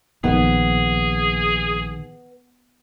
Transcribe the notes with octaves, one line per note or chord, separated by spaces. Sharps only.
A#1 D#3 B3 G#4